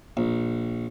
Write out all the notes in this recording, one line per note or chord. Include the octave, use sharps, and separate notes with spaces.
A#1